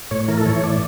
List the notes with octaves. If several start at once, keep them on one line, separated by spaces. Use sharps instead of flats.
A2 C#5
E3 A#4
A4
E3 C#5
A2 D5